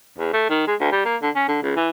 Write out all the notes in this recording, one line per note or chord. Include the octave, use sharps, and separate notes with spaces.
E2
A3
D#3
G#3
D2
G3
A#3
D3
C#4
D3
C#2
E3